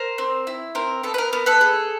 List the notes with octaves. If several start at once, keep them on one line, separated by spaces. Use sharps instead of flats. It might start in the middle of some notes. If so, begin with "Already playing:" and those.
Already playing: A#4 C5
C4
E4
C4 A#4
B3 A4
B4
A#4
B3 A#4
A4 B4
G#4